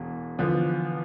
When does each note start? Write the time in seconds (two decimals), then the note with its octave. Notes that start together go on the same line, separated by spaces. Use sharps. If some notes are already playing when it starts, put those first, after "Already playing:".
Already playing: E1 E2 B2
0.39 E2 D3 F3 B3